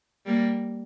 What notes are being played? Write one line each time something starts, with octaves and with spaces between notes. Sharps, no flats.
G3 A#3